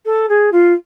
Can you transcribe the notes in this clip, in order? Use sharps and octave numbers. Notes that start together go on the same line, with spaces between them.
A4
G#4
F4